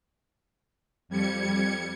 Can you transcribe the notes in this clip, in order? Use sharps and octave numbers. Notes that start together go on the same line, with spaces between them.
F2 G3 G#6 C#7